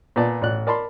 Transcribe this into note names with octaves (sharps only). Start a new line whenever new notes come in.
A#2 B3 D5 A5
A1 D5 F#6
A#4 D5 A5 B5 C6